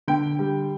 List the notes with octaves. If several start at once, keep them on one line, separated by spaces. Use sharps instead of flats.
D3 G5
G3